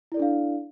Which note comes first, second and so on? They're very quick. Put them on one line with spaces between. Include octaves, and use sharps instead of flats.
E4 D5 A4 D4 F5